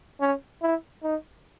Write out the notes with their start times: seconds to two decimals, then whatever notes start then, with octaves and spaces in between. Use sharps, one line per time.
0.20 C#4
0.62 E4
1.03 D#4